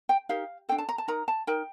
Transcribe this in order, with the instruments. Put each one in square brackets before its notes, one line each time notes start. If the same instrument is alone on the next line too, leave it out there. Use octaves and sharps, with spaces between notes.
[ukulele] G5
D#4 G4 A#4 F5
D4 A4 G5
A5
A#5
A5
D#4 A#4 A#5
A5
D#4 A#4 G5